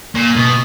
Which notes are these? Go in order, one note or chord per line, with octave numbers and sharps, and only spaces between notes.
A#2
B2